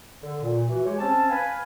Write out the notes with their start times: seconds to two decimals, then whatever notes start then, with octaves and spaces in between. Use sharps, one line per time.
0.22 D3
0.42 A#2
0.68 E3 F#4
0.85 G#3 G4 C#5
0.99 C4 C#4 A5
1.30 B4 F5 G#5